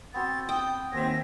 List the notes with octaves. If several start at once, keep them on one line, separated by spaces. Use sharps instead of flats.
B3 C4 F#4 A6
G5 D#6
D#2 C4 E5 G#5 A#6